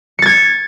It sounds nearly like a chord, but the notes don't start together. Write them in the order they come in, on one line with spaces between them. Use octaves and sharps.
C#7 A6 G#6